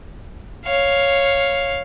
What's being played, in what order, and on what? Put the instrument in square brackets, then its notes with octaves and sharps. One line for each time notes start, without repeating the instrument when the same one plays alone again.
[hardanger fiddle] C#5 F5